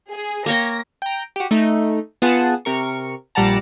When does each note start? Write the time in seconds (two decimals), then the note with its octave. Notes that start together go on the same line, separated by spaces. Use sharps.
0.11 G#4
0.46 A#3 C#5 G5 A#6
1.02 G5 A#5
1.36 F#4 G4
1.51 A3 D#4
2.22 B3 F4 G#4 F#5 A5
2.65 C3 A#4 C#6
3.35 A#1 G3 D5 F#5 A5 A#5